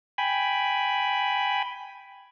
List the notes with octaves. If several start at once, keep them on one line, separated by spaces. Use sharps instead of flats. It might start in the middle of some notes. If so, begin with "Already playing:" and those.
G5 G#5 B5